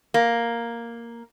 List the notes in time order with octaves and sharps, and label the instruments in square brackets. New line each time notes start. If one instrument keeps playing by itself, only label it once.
[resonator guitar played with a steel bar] A#3